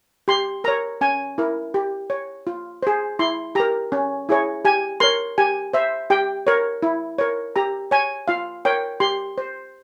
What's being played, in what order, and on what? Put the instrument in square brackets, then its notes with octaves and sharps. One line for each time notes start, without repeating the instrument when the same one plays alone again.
[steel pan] G4 C6
A#4 C#5 A#5
C#4 G#5
E4 A#4
G4
C#5
F4
G#4 C5
E4 C6
G4 A#4 A#5
C#4
E4 G#4 C#5
G4 G#5
A#4 C#5 C6
G4 G#5
C5 E5
G4 G5
A#4 C#5
E4
A#4 C#5
G4 A#5
C#5 G#5
F4 F5
A#4 C#5 G5
G4 C6
C5